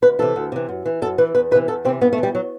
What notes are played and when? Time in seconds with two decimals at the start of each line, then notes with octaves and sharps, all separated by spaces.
0.02 D2 B4
0.19 C3 E3 A4
0.36 D2
0.52 C3 E3
0.69 F#2
0.86 E3
1.02 F#2 A4
1.18 E3 B4
1.35 E2 B4
1.51 C3 B4
1.55 E3
1.68 E2 A4
1.85 C3 C4
1.89 E3
2.01 G2 B3
2.13 A3
2.18 E3
2.23 G3
2.35 F#3